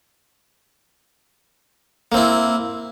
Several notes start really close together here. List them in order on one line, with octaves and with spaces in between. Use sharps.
A#3 C4 E4